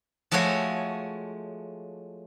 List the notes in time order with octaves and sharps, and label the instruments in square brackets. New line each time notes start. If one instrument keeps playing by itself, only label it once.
[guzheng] F3 G#3 A3 F#4 C#5